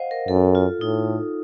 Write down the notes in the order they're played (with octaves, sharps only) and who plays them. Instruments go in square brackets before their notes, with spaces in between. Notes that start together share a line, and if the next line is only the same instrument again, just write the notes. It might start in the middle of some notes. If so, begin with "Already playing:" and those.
Already playing: [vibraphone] C5 D#5 F5 F#5
A#4
[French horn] F#2 [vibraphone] A4
[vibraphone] F4
[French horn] A2 [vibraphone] D#4